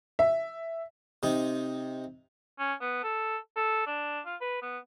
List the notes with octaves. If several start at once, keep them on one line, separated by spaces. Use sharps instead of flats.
E5
C3 D#4
C#4
B3
A4
A4
D4
F4
B4
B3